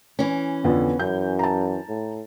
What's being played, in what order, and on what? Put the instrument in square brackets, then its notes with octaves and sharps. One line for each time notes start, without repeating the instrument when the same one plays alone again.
[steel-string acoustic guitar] E3 C#4
[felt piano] F2 D3 [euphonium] B3
[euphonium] F#2 [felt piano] G6
[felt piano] A5 A#5
[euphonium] A2